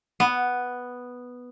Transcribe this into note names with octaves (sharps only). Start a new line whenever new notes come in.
B3